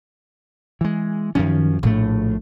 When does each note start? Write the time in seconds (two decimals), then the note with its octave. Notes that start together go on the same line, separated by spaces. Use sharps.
0.81 E3 G#3
1.35 F#2 D#3 F3 C#4
1.83 A#1 A2 D3 A3